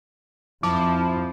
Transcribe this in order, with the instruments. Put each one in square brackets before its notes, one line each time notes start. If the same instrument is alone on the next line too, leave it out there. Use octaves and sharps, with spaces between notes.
[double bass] F2 E4 [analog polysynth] F3 [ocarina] A5 [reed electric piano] D6